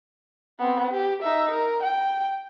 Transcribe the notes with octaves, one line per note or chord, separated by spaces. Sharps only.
B3 C4
G4
D#4 E5
A#4
G5